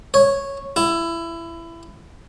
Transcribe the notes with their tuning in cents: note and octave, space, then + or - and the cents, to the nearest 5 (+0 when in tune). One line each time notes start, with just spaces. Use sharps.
C#5 -5
E4 +20